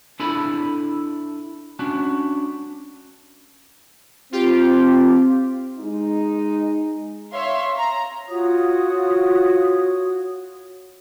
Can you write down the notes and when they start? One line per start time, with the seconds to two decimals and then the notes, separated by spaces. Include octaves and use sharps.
0.20 D4 E4 A4 G#5 B5
1.79 C#4 D4 F#4
4.32 C4 F4 G4
5.79 G#3 D#4
7.32 C#5 E5 F5 C6
7.76 A#5
8.28 F4 F#4 C#5 D#6